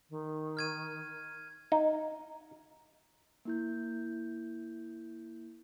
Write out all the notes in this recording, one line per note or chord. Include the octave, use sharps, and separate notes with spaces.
D#3
F6 G#6 D#7
D#4
A#3 E4 G6